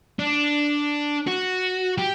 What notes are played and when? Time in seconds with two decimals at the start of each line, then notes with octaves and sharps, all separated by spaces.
0.19 D4
1.27 F#4
1.98 G4